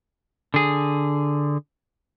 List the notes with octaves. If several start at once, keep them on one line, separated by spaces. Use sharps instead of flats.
D3 G#4